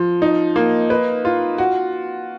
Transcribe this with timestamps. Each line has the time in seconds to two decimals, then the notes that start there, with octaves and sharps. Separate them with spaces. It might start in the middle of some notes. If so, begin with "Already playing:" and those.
Already playing: F3
0.22 D#4
0.56 A#3
0.90 B4
1.25 F4
1.58 F#4